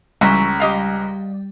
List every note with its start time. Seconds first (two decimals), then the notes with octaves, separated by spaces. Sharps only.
0.21 C#2 E3 F#3 G3 A#5 B6
0.60 G4 D#5 F5